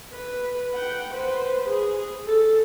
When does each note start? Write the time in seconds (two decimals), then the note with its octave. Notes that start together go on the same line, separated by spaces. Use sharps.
0.14 B4
0.73 F#5 G5
1.13 B4 C5
1.68 G#4
2.26 A4